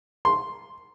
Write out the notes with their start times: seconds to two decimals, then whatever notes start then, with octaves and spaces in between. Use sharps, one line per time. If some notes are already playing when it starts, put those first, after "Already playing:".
0.25 C6